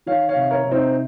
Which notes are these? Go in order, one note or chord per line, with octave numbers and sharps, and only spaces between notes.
D#3 C#5 F5
C#5 F5
C3
A#4 C#5
C3
C4 D#4